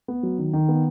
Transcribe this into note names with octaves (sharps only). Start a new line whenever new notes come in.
B3
F#3
D#3
D#3
B3